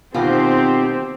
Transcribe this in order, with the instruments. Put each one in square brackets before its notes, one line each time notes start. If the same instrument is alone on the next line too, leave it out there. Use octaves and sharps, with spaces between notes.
[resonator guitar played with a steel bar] B2 D#3 [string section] C4 [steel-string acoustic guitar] D#4 F4 [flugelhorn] G4